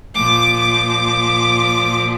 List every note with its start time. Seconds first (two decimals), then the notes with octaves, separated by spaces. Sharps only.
0.15 A#2 F3 D6
0.60 D6